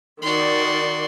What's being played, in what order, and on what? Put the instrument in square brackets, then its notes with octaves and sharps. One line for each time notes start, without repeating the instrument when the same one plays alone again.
[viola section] D#3 D5 [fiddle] F#4 C6